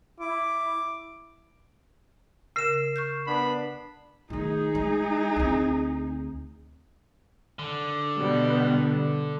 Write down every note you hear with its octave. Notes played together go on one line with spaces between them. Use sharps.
E4 D6
C#3 A#4 C7 E7
C#6 F6 G6
B3 D4 B5
D#3 A3 D#4 G#4
G#3
D2 C4
D3
B2 G3 B3